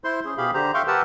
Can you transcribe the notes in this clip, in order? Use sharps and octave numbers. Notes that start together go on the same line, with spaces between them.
E4 C5 C6
C#4 G#4
B2 G4 G#4 F5 B5
D3 G4 C5 A#5
E5 F5 G5 C6 C#6
G4 A#4 B4 F#5 A5 E6